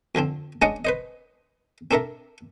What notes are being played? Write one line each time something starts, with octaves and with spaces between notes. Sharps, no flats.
F2 D3 F3 C4
G#3 C#4 D4 D5 D#5 F#5
B4 C5 D#5
C4 D4 A4 A#4 E5